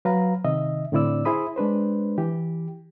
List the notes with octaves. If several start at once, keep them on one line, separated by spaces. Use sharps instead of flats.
F#3 B4 F5 A#5
C3 D#3 D#5 E5
A2 D3 C4 E4 D5 E6
E4 G#4 C5 B5 D#6
G#3 D4 B4 C5
E3 G4